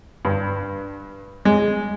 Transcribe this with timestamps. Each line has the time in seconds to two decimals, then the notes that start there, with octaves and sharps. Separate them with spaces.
0.25 G2
1.45 G#3